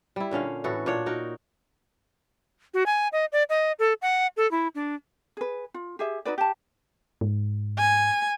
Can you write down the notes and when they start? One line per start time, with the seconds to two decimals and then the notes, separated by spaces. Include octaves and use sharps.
0.16 G3 E4
0.31 A#2 D3 C#4 F5
0.64 A2 E3 F#4 A4
0.86 A#2 D4 C#5
1.06 D#4 F#4 A#4
2.74 F#4
2.86 G#5
3.12 D#5
3.32 D5
3.50 D#5
3.79 A4
4.02 F#5
4.37 A4
4.51 E4
4.75 D4
5.37 G#4 B4
5.74 F4
5.99 G4 G#4 E5
6.25 D#4 F#4 B4 D5
6.38 G4 A5
7.21 G#2
7.78 G#5